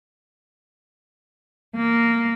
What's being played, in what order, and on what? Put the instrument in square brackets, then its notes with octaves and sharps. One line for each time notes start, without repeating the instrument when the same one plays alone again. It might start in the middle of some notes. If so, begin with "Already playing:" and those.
[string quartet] A#3